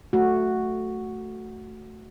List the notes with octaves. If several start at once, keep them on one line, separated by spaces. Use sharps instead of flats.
A3 F#4